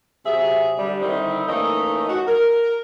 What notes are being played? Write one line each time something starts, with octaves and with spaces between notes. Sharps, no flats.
C3 F#3 G#4 E5
D3 G3 D4
D3 D#3 G3 C4 D#4 E4
E3 A3 A#3 C#4 D#4 D#5
F#4
A#4